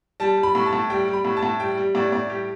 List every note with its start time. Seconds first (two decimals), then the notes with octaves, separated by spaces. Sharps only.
0.20 G3 A5
0.37 G3
0.43 B5
0.55 A2
0.66 A5
0.73 A2
0.90 G3 G5
1.08 G3
1.13 B5
1.25 A2
1.37 A5
1.43 A2
1.60 G3 G5
1.77 G3
1.95 A2 D5
2.12 A2 D5
2.30 G3 G4